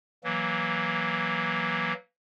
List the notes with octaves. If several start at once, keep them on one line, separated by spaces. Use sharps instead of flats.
E3 F#3 A#3